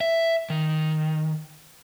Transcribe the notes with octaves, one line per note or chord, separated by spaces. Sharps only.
E5
D#3